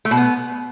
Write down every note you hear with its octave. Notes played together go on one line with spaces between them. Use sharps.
A3
B2
B3